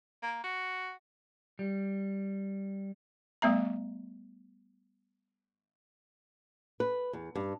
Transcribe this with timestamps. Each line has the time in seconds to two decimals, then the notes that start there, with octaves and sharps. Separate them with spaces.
0.23 A#3
0.44 F#4
1.59 G3
3.42 G3 A3 B3 E5 A#5
6.80 B4
7.13 E2
7.35 G2